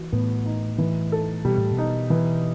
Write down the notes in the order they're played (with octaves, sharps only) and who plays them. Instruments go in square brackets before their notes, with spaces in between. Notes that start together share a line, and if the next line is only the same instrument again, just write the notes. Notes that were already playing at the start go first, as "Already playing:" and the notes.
Already playing: [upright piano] E3 F#4
[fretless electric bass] A2 [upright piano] B3
[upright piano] D#4
E3
A4
[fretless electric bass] B2 [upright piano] G3
[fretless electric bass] A2
B2
[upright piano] D#4
E3